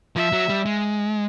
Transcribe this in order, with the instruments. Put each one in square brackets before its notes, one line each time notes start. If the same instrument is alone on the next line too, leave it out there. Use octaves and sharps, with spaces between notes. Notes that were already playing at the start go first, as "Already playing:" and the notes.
[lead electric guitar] F3 [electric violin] E5
[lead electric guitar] F#3
G3
G#3